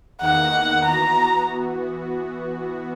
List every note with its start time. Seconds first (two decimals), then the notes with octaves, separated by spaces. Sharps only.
0.21 E2 D#3 A#3 D#4 F#5
0.85 E3 B3 F#4 A#5